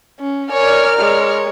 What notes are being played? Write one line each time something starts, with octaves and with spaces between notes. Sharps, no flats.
C#4
A#4 C#5 D5 G#5 F6
G#3 C#5